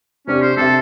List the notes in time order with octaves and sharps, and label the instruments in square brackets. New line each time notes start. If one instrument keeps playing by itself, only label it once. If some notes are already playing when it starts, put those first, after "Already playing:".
[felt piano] C3 D4 G4 [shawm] C#4
[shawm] C5
[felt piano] C3 G4 E5 [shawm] A4